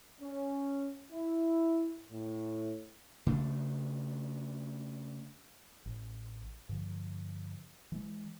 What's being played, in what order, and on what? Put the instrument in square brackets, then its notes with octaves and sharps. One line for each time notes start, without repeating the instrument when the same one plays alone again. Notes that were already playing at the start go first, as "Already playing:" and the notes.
[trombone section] C#4
E4
A2
[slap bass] C#3 A3 D4
[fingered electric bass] A1
G2 D3 F3
E3 G3 G#3